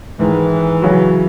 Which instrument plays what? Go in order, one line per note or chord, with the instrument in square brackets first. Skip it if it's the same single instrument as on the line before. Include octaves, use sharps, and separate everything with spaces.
[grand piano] G#2 D#3 G#3 [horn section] E3
[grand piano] C#3 F#3 C#4 F#4